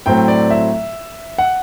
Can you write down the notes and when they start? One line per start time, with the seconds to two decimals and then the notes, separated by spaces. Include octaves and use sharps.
0.06 A2 F#3 A3 C4 G5
0.28 D5
0.50 E5
1.38 F#5